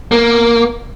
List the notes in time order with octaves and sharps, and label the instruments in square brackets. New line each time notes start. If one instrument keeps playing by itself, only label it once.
[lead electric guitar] A#3